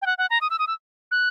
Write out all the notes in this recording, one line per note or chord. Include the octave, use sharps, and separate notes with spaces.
G5
F#5
F#5
A#5
D#6
E6
D#6
E6
F#6